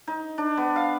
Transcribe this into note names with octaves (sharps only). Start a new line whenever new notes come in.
D#4
D4
B3
F5